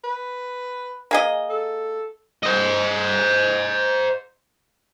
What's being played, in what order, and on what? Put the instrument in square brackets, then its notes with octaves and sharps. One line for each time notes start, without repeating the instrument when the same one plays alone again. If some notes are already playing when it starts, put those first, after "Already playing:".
[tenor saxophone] B4
[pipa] A#3 G#4 D#5
[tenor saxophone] A4
[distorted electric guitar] C5 D#5